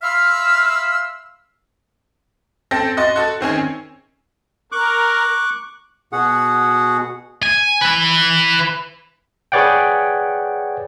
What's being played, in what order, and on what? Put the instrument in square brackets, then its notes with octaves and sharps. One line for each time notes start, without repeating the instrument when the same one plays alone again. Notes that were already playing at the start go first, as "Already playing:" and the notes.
[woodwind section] E5 F5 B5 C6 E6 F6
[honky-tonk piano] C4 A4 G5 A#6
F#4 D#5 C6 A6
F#4 A4
D#3 C4 C#4 G#4
[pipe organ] A#4 [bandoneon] C#6 D6 F#6
[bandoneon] B2 F#4 G#4 F#5
[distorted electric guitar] G#5
E4 B4
[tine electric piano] G#4 B4 C#5 D5 F#5 G5